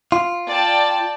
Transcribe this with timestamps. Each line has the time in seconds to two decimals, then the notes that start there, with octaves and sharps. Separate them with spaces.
0.12 F4
0.48 D5 G5 A5